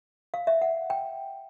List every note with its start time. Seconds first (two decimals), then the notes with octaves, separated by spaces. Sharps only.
0.34 F5
0.47 E5
0.62 F#5
0.90 G5